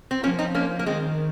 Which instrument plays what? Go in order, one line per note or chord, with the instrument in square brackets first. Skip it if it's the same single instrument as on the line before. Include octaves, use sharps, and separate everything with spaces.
[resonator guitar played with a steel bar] C4
[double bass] F3 [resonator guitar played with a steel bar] A#3 C#4
[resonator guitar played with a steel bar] C4 D#4
A#3 C#4
A#3
[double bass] D#3 [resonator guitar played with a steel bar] G#3 C4